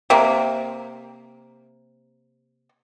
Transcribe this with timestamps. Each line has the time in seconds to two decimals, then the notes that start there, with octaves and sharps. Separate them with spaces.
0.10 C3 A#3